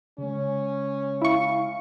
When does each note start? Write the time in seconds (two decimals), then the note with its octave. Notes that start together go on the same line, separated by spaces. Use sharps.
0.18 C#3 G#3 C#4
1.21 E4 F5 C#6